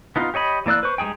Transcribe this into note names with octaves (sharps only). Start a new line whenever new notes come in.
B3 D#4 F4
G4 C#5 D#5 B5
E3 A#3 D5 E6 F#6
B4 C5 C#6
G3 G#3 D#4 G#4 G5